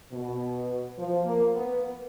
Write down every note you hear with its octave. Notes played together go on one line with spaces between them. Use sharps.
B2
F3
A#3
B3